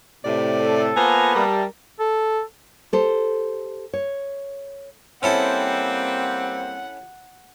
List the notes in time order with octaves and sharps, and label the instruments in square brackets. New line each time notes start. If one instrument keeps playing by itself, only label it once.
[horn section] A2 C3 [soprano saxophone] D5
[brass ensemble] A4
[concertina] A#3 B3 B4 [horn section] F4 C5 A#5 [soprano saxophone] G#5
[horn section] G3 [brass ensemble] G#4 E5 A5 [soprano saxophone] A#4
[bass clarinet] A4
[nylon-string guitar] G4 A4 C5
C#5
[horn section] G3 A#3 C4 [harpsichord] C#4 E4 A4 [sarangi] F#5